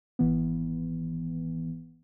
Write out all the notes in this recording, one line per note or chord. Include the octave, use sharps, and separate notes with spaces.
G#1 E3 B3